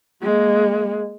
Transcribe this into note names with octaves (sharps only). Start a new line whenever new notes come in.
G#3 A#3